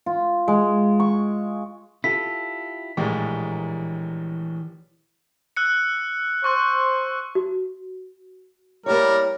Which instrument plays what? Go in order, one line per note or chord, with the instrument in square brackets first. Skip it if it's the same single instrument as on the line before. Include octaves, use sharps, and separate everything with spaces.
[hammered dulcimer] F4
G#3
C#6
[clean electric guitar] E4 F4 G4 [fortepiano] A4 [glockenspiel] B6
[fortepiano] A#1 A2 G#3 [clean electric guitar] E3 G4 A#4
[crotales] E6 F#6 C#7
[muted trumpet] C5 [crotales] C#6 E6 F#6
[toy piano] F#4
[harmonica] G3 A#4 [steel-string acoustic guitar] A#3 E4 C#5